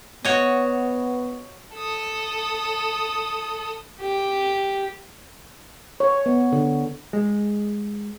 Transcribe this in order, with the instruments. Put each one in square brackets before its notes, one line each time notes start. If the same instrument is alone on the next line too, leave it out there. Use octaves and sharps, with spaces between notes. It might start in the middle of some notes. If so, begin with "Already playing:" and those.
[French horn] B3 [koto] F#4 C#5 D#5
[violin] A4 D#6
[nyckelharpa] G4
[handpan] C#5
B3
D3
[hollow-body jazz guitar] G#3